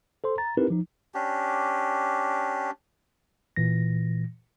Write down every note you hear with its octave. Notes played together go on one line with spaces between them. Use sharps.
A4 C5 C6
A#5 A6
C4 D#4 E4 G4 A#4 B4
F3 D#4
C#4 D4 G4
A#2 E3 A#6